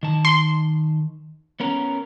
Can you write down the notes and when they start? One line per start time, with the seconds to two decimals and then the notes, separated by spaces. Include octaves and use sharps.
0.03 D#3 A5
0.25 C6
1.60 B3 C#4 A#4